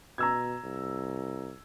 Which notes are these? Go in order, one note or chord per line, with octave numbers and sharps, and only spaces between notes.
B2 A#5 E6 G#6
C2